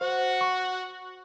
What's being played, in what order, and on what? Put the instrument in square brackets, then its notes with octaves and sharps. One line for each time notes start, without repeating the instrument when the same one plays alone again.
[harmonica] F#4 F#5 [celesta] C5
[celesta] C#6